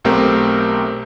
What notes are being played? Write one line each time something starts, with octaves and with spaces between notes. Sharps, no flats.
B1 A3 C4 G4 A#4 C5